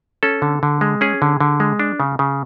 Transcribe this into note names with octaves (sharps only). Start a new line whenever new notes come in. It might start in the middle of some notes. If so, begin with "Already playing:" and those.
C#4 A4
D3
D3
G#3
C#4 G#4
D3
D3
G#3
D4
C#3
C#3